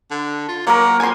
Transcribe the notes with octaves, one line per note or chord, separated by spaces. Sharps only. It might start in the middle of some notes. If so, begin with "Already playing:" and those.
D3
F4
F#3 A#3 A#4
F2 G#5 C6